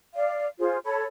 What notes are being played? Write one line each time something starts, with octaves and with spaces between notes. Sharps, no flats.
D5 F5
F4 G#4 C5
A4 C#5 B5